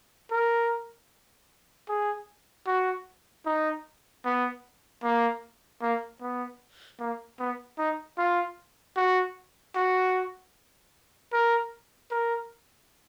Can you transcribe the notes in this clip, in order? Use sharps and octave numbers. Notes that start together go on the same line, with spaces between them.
A#4
G#4
F#4
D#4
B3
A#3
A#3
B3
A#3
B3
D#4
F4
F#4
F#4
A#4
A#4